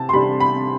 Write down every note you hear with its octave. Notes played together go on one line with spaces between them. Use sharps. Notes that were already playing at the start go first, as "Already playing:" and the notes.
Already playing: C3 A5
C6
C3 G3 D4 B5
B5